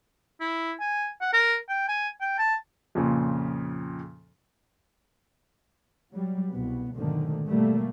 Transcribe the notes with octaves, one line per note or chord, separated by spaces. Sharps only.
E4
G#5
F#5
A#4
G5
G#5
G5
A5
F2 A#2 C#3
F#3 G3
C2 B2 B3
B1 G#2 D3 D#3 A3
B2 G3 A3 A#3